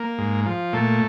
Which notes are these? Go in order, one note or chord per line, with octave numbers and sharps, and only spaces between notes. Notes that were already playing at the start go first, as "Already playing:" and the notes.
Already playing: A#3
G#2
F3
A#2 A3